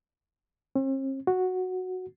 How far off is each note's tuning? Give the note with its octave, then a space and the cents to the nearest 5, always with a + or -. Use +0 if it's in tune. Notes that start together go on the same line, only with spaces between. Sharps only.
C4 +45
F#4 -5